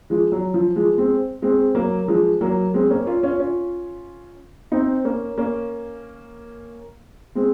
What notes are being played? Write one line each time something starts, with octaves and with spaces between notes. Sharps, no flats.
F3 G#3
F#3
F3
F3 G#3
G#3 C4
G#3 C4
F#3 A#3
F3 G#3
F#3 A#3
G#3 C4
A#3 C#4
C#4 F4
C#4 F4
C#4 F4
C4 D#4
A#3 C#4
A#3 C#4
G#3 C4